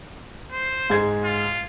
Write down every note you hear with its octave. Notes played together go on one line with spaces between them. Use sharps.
C5
G#2 G#3 G#6
F4